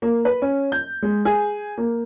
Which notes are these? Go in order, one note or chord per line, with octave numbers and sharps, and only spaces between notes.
A#3
B4
C#4
G6
G#3
G#4
A#3